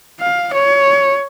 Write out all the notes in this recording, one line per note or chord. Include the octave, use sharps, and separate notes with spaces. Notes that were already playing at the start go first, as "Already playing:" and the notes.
F5
C#5